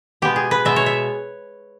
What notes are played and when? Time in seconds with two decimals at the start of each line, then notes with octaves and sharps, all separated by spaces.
0.22 B2 G#3 B3 G4
0.36 G#4
0.51 B4
0.65 B2 G#3 B3 E5
0.76 C#5
0.86 E5